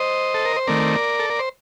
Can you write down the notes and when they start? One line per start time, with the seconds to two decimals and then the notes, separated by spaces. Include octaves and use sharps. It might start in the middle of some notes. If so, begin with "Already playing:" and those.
Already playing: C5 D#5
0.34 A4
0.45 A#4
0.56 C5
0.67 D#3 A3 C4 A#4 D5
1.19 A4
1.30 A#4
1.39 C5